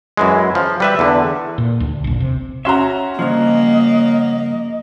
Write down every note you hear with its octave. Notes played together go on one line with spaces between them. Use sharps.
F#2 E3 G#3
F3
G3 B4 E5
E2 D3
A#2
D2
E1 A#1
C3
C#4 F#4 E5 A#5 C6
G2 C#3 F3 A#3 D#5